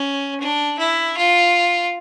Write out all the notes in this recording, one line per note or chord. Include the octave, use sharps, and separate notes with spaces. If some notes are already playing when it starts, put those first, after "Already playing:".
Already playing: C#4
D4
E4
F4